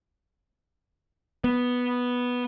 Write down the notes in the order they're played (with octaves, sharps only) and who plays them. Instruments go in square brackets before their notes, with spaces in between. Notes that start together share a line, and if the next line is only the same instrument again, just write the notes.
[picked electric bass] B3